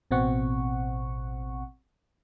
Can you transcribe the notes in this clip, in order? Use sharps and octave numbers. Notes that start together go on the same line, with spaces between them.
A1 B2 C4 F#5 C#6